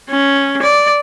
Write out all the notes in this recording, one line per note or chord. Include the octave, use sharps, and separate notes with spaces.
C#4
D5